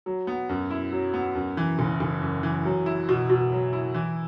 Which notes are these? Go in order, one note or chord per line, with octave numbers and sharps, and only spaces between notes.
F#3
B3
F#2
E4
F#3
B3
F#2
E3
F#1
F#1
F#2
E3
F#3
E4
B2
B2
F#3
E4
E3